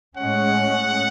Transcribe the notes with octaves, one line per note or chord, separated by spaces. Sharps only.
A2 G#3 C#4 F#5